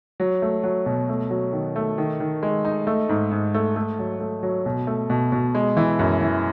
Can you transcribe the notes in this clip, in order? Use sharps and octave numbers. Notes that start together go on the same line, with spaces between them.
F#3
A3
F#3
B2
A3
F#3
D#3
A3
D#3
D#3
G#3
D#4
A3
G#2
G#2
A3
A3
F#3
A3
F#3
B2
A3
B2
B2
G#3
E3
F#2
E3